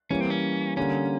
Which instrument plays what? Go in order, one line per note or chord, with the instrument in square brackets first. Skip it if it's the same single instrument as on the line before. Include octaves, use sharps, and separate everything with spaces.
[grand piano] E3 G3 A#3 [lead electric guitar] C#4
[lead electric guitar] C4
C#4
[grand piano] D3 G3 A#3 [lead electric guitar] C#4